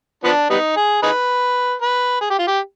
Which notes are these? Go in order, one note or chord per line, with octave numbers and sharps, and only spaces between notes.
F3 B3 D4
G3 B3 D#4
G#4
D#4 G#4 B4
B4
G#4
G4
F4
G4